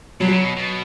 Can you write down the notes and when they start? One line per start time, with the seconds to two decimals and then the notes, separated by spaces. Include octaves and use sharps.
0.21 B2 F#3
0.33 C#3
0.45 B2
0.56 B2